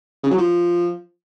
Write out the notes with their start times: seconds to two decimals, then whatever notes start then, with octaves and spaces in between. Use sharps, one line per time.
0.24 C#3
0.31 F#3
0.38 F3